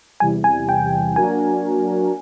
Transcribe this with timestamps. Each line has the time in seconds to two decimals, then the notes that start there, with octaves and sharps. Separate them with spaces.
0.20 E2 C3 E3 G3 G#5
0.44 G#5
0.69 G5
1.16 F#3 A#3 D4 F#4 A#4 G#5